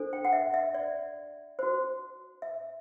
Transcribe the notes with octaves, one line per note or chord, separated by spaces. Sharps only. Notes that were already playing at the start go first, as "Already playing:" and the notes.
Already playing: D4 A4 C5
G5
F#5
E5
E5
D5
F#4 C5
E5